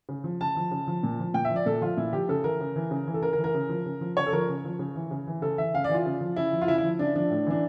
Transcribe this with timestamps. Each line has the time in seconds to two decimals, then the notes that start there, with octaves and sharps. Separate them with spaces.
0.09 C#3
0.24 F3
0.41 C#3 A5
0.56 F3
0.71 C#3
0.87 F3
1.03 A#2
1.19 F3
1.34 A#2 G5
1.45 E5
1.50 F3
1.56 D5
1.66 A#2 A4
1.81 F3 F4
1.97 A#2 E4
2.13 F3 G4
2.29 C#3 A4
2.44 E3 A#4
2.60 C#3
2.76 E3
2.91 C#3
3.07 E3
3.14 A4
3.22 C#3 A#4
3.33 A#4
3.38 E3
3.44 A#4
3.54 C#3
3.69 F3
3.86 C#3
4.01 F3
4.17 C#3 C#5
4.26 A4
4.33 F3 A#4
4.49 C#3
4.65 F3
4.79 C#3
4.96 E3
5.11 C#3
5.27 E3
5.42 C#3 A4
5.58 E3 E5
5.74 C#3 F5
5.84 D5
5.89 E3
5.94 F4
6.06 C#3
6.21 F3
6.36 C#3 E4
6.53 F3
6.62 F4
6.68 C#3 E4
6.78 E4
6.84 F3
6.99 C#3 D4
7.16 F3 D4
7.30 A2
7.47 E3 D4